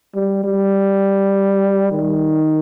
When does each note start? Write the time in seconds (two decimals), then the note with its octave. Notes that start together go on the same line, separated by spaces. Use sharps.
0.15 G3
0.44 G3
1.92 D#3